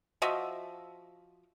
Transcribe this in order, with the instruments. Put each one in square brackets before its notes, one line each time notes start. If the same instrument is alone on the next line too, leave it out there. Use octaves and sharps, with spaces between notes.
[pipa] F3 F#4 D#5 E5